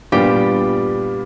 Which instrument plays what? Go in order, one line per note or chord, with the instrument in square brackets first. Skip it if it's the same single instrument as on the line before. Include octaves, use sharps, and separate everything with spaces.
[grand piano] A#2 G3 B3 D4 F4 [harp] G4